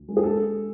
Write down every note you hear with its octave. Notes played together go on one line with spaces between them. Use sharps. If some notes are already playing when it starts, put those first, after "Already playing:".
Already playing: D2
G#3
G#4
A4